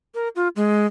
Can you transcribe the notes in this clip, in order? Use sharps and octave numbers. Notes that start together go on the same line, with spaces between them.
A#4
F4
G#3